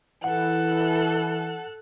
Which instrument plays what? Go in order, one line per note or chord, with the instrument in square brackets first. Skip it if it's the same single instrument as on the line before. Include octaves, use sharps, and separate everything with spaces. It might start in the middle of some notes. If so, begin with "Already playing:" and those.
[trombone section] E3 [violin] A4 F#6 [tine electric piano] F#5